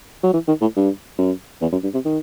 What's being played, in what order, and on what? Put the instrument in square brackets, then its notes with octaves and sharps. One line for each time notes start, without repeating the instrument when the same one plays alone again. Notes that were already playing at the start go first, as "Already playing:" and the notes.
[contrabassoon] F#3
E3
D#3
A2
G2
F#2
E2
F#2
G2
C3
D#3